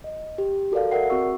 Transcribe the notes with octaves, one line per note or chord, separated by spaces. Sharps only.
D#5
G4
F#4 A4 A#4 D5 F5
A#4 D5 E5 F#5 C7
C4 F#4 G#4 C#6 E6